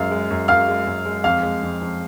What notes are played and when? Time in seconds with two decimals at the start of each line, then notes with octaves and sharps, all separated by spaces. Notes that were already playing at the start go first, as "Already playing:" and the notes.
Already playing: F#2 G#3 F5 F6
0.11 G#3
0.30 F#2
0.48 F#2 F5 F6
0.68 G#3
0.87 F#2
1.06 G#3
1.24 F2 F5 F6
1.43 G#3
1.63 F2
1.81 F2